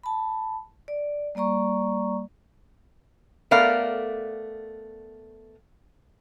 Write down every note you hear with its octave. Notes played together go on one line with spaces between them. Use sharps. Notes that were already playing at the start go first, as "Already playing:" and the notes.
A5 B5
D5
G3 A#3 D5 A#5 C#6
A3 B3 A#4 D5 F5